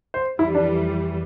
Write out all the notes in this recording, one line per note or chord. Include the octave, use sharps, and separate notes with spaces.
C5
F2 E3 G3 E4
D4